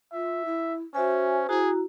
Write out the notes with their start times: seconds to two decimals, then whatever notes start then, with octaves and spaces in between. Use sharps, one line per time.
0.13 F4 E5
0.45 E4
0.95 C#4 F#4 C5 E5 G#5
1.49 E4 F#4 G#4 A#5